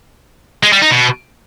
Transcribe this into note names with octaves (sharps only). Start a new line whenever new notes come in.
G#3
G3
D#4
B2